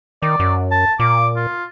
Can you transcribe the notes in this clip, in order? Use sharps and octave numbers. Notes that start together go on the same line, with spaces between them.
D#3 D5
F#2
A5
A#2 D6
F4